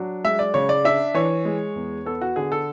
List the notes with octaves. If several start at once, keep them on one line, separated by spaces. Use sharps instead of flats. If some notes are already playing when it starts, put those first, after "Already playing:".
Already playing: F#3 D4
G#3 E5
D5
C#3 C#5
D5
D4 E5
E3 C#5
G#3
E2
B3 A4
F#4
D3 G#4
A4